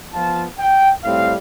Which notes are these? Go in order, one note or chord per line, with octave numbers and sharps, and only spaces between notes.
F3 B3 F4 A5
G5
A2 G3 C4 F5